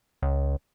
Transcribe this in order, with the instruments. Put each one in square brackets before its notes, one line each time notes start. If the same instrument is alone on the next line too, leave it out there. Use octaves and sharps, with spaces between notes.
[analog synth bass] C#2